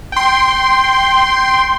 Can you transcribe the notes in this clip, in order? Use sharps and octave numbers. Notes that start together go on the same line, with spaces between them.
G5 C6